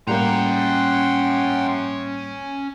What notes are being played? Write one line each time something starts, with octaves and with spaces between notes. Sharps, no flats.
A2 G3 A#3 C#4 F#5 G5 A#5 C6